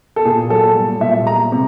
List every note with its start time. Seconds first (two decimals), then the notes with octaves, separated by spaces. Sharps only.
0.16 A4
0.25 A#2 G#4
0.50 F#3 A4
0.76 G3
1.01 A#2 E5
1.26 G#3 A#5
1.52 C3